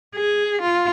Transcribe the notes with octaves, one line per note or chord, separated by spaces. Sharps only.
G#4
F4